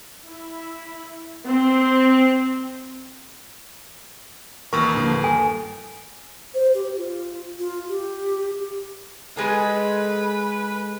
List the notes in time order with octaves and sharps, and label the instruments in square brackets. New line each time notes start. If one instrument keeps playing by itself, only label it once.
[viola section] E4
C4
[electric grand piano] D#2 A#4 [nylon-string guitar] E3 [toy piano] C#6 D#6 E6
[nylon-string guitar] D3 F3 A#3
[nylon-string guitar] G2 [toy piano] A4 G#5
[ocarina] C5
G4
F4
F4
G4
[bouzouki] G#3 G#4 A4 [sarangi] B4